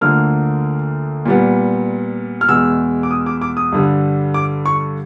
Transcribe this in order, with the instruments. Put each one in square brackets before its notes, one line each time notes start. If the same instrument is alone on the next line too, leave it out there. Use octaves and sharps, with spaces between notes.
[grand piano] D2 D3 F3 A#3 F6
A#2 G3 B3
F6
E2 B2 G#3 E6
D6
D#6
D6
D6
D#6
G2 D3 G3
D6
C#6